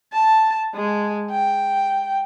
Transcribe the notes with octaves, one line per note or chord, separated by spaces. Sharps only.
A5
G#3
G5